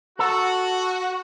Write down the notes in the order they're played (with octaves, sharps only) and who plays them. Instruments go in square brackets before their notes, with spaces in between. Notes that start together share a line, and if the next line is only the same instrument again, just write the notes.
[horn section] F#4 [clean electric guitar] A4